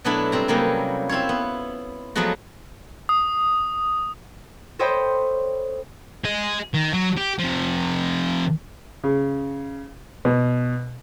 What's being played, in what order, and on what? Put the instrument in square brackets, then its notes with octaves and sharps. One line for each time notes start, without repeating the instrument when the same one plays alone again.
[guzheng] B2 F#3 A3 B3 D4 E4
G3 C4 A#5
C3 F#3 G3 A#3 B3 C#4
C4 E4 F4 C#5
B3
F3 F#3 G#3 A3 B3 F#4
[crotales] D#6
[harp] A4 C5 C#5 D#5 G5 B5
[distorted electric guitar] G#4 D#5
D#3
F#3
G4
C3 F3
[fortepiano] C#3
B2